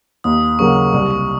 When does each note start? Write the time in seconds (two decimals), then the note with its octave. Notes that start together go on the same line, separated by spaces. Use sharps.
0.24 D#2 D#6
0.59 C#3 F#3 A#3 C#6
0.93 C2 C#6
1.11 C#6